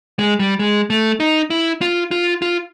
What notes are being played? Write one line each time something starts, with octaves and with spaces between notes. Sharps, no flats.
G#3
G3
G#3
A3
D#4
E4
F4
F4
F4